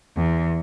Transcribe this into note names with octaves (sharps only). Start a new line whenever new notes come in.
E2